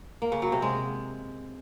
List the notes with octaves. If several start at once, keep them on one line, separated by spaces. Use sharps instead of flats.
A#3
C#3
F#3
C3
G#3